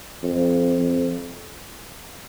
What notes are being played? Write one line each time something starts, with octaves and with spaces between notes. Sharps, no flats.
F2
F2